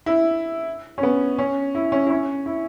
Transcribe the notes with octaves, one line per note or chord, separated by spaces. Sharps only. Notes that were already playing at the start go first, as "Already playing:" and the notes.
E4
C#4
B3
C#4
E4
C#4
E4
C#4
E4